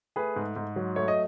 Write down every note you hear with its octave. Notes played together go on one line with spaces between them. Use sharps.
A3 G#4 B4
G#2
G#2
F#3
A3 C#5
D#5